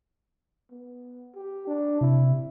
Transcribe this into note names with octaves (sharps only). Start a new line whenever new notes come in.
B3
G4
D4
C3 E4